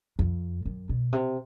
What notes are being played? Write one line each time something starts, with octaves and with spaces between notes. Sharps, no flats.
F2
F#2
B2
C3